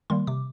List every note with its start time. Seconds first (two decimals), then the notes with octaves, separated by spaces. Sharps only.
0.10 D#3 G3 A#3 C6
0.27 C3 D6